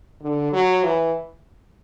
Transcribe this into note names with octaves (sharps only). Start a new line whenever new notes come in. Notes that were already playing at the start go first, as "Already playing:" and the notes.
D3
F#3
E3